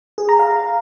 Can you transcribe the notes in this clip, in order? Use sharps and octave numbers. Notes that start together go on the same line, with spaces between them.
G#4
A#5
F5